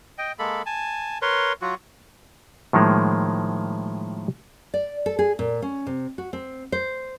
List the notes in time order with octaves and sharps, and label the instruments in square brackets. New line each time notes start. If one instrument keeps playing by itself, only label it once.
[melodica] D#5 G5
G#3 A#3 A4 B5
G#5 A5
A#4 B4 C#5 C6
F#3 F4 F#4
[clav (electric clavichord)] A2 D#3 F3 G#3 A#3
[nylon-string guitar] D5
A4
G#4
A#2
C#4
C3
F#4
C4
C5